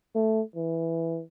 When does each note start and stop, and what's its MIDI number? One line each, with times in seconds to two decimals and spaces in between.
0.15 0.42 57
0.55 1.22 52